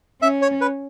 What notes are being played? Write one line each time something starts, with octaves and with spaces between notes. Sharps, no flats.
C#4 E5
C#5
B4